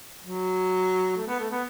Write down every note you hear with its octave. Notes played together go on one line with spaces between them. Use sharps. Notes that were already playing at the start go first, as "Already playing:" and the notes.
F#3
A3
B3
A3
B3